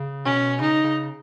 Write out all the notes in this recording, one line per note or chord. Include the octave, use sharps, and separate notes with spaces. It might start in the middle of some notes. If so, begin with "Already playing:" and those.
Already playing: C#3
B2 C#4
C#3 D#4
C#3